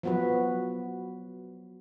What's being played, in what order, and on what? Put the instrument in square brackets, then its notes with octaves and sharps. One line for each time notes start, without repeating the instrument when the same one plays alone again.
[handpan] F3 F#3 B3 F#4 B4